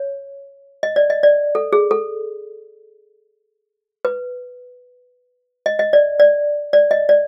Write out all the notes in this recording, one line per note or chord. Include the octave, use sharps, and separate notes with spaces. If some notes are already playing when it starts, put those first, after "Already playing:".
Already playing: C#5
D#5
D5
D#5
D5
A4
G#4
A4
B4
D#5
D#5
D5
D5
D5
D#5
D5